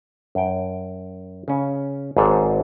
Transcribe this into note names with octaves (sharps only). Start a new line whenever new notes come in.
F#2 G5
C#3 C#4
G#1 G#2 G#4 A4 C5 C#5